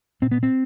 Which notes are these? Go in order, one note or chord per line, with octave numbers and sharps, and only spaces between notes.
A#2 C4
B3
C4